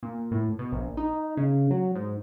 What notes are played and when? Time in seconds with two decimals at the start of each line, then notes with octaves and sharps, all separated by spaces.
0.03 A#2
0.31 A2
0.59 B2
0.72 A#1
0.97 D#4
1.37 C#3
1.71 F#3
1.96 G#2